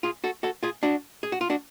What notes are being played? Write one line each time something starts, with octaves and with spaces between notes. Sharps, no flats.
F4 G#4
F#4 A4
F#4 A4
F4 G#4
D4 F#4
G#4
F#4
F4
D4 F#4